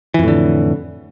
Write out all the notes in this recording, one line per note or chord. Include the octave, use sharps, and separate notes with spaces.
F2 A2 D3 E3